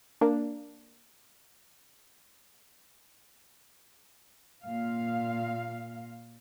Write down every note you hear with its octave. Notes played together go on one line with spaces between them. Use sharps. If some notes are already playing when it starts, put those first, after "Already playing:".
A#3 D4
A#2 F5